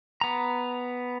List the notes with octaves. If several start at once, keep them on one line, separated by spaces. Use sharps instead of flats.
B3 A#5